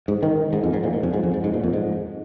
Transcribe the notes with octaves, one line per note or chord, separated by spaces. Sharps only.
G#2
D#3
G#2
F2
G#2
A#2
G#2
F2
G#2
F2
G#2
G#2
A#2
F2
G#2